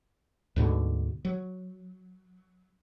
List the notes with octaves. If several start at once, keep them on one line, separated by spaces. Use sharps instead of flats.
D2 G#2 B2 D3
F#3